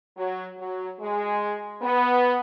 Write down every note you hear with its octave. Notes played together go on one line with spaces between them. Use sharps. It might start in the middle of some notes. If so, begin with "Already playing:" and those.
F#3
F#3
G#3
B3